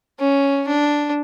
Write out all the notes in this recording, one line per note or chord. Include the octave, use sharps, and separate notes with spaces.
C#4
D4